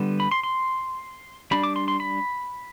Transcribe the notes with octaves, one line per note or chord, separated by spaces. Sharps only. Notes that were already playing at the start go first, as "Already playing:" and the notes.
Already playing: D3 G3 B3
B5
C6
C6
G3 D4 B5
D6
C6
C6
B5